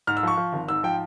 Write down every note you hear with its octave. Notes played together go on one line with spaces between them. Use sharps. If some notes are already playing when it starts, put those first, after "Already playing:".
G#2 F6
E6
F3 C#6
F3
G#1
G#2 E6
F3 G5